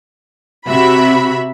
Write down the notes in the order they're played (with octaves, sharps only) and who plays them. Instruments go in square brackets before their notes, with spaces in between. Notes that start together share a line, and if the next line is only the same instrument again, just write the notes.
[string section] C3 F#4 E5 B5